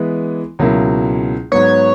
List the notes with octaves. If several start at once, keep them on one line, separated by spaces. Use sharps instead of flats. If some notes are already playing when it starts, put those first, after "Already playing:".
Already playing: E3 G#3 B3
C#2 B2 F#3 A#3 E4
G#2 F#3 B3 C#5